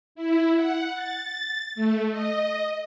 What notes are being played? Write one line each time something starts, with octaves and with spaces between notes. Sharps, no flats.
E4
F#5
A6
A3
D#5